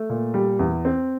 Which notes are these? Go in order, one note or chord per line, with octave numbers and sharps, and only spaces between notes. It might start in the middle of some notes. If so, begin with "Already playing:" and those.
Already playing: A3
A#2
G3
E2
C4